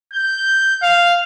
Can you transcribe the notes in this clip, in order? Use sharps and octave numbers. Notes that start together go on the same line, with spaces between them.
G6
F5